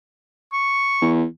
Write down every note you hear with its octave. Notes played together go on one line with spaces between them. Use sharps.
C#6
E2